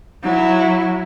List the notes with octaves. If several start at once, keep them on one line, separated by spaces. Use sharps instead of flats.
F#3 E4